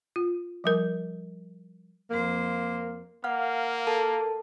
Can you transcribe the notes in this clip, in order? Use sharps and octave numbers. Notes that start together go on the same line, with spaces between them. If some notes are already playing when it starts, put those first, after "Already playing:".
F4
F3 G3 A#4
F2 A#3 C5
A#3 F5 F#5 F6
A4 A#4 A5